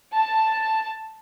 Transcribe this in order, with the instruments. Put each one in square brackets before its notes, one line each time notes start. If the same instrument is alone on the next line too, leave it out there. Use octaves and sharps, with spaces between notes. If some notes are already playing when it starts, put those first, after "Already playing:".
[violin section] A5